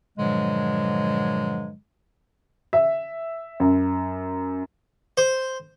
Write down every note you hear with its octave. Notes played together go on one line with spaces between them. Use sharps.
G2 A#2 D3 F3 F#3 G#3
E5
F#2
C5